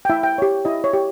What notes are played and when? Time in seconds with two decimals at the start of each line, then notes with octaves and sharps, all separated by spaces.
0.05 G5
0.10 E4 E5
0.23 G5
0.38 G4 C#5
0.65 E4 D#5
0.84 C#5
0.93 G4